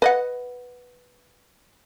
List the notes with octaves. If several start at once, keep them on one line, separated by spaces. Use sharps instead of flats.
B4 D#5 F#5